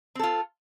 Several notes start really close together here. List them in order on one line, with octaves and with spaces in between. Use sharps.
C4 A4 F4